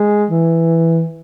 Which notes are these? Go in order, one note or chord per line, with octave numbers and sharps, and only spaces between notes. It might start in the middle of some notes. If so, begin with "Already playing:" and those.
Already playing: G#3
E3